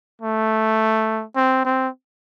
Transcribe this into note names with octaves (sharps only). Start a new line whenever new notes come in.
A3
C4
C4